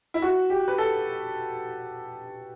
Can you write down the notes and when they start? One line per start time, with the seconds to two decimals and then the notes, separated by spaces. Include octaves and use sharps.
0.14 E4
0.22 F#4
0.50 G4
0.68 B4
0.78 A4